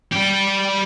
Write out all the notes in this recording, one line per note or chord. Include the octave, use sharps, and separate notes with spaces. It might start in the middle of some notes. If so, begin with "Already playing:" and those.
G3 G4